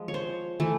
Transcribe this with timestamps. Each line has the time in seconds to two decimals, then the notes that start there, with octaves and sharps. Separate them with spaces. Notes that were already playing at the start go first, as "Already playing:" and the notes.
Already playing: F3 G#3
0.08 C#5
0.14 C5
0.60 E3 A3